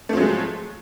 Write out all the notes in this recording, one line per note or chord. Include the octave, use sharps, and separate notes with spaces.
F3 F#3 G#3 A3